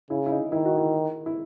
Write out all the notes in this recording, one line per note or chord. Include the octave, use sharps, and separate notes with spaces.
C#3 E4
E4
D#4
D#3 E4
F#4
E4
E4